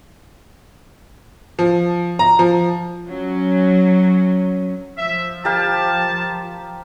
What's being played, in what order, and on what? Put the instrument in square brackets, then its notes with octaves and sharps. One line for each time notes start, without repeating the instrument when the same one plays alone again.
[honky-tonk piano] F3
A#5
F3
[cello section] F#3 C#4
[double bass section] F3 [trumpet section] E5
[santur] G4 A#4 F5 [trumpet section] A5